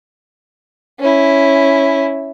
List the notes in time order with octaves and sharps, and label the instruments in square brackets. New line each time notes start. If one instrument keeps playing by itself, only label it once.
[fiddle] C#4 E4